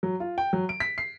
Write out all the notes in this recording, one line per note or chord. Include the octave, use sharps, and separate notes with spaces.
F#3
F4
G5
F#3
D7
B6
C7